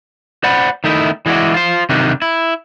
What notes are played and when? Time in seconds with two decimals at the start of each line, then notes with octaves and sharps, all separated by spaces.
0.44 C5 D5 F#5 B5
0.84 D#3 A3 D#4 E4
1.26 E3 G#3 E4 F#4 D5
1.54 F4 C5
1.89 C3 D#3 F#3 G3 D4 D#4
2.22 E4